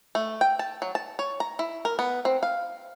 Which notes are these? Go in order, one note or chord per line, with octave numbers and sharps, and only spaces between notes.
A3
G5
A5
F#3
A5
C#5
A#5
E4
A#4
B3
C4
F5